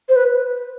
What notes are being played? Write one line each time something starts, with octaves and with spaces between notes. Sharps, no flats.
C5
B4